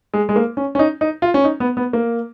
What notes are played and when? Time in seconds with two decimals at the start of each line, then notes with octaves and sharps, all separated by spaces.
0.14 G#3
0.29 G#3
0.36 A#3
0.57 C#4
0.75 C#4
0.79 D#4
1.01 D#4
1.22 F4
1.34 C#4
1.44 D#4
1.60 B3
1.77 B3
1.93 A#3